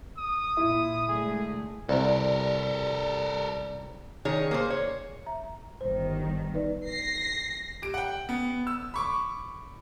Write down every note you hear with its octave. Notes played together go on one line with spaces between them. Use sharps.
D#6
A#2 E4
D3 G#3 A3 G#4
C2 G3 A4 A#4
D#3 G#4 C#5
A#3 G#4 C5
C#5
E5 A#5
G1 D#3 C5
D#4 B4 D5
A#6 C7
G4 D7
F#5 G5
B3
E6
B5 C#6 D6